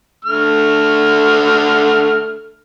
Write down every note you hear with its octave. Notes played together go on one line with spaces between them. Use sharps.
D3 A3 F6